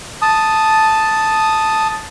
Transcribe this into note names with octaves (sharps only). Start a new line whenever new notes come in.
A5 D#6